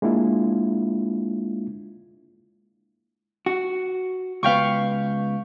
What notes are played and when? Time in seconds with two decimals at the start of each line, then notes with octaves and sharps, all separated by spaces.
0.02 G#3 A#3 D4 E4 F4
3.46 F#4
4.43 C#2 B3 F5 G5 C#6